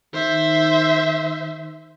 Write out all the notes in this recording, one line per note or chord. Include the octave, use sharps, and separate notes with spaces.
D#3 C5 E5